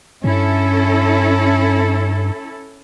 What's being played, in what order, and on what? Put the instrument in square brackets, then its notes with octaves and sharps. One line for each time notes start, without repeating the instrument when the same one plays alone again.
[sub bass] G2 [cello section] C#4 E4 A4